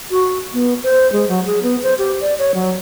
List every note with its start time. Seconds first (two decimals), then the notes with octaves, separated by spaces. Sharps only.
0.11 F#4
0.54 B3
0.83 C5
1.12 G#3
1.28 F#3
1.47 G#4
1.62 B3
1.83 C5
1.98 G4
2.21 D5
2.39 C#5
2.55 F#3